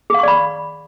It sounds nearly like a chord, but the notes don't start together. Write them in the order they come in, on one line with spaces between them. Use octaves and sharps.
G#4 F5 C#6 D5 B5